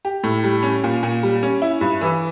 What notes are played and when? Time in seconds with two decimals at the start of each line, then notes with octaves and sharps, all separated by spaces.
0.05 G4
0.24 A2
0.44 G3
0.63 C#4
0.84 A#2
1.03 A#2
1.23 G3
1.43 C#4
1.62 E4
1.81 G2
2.01 E3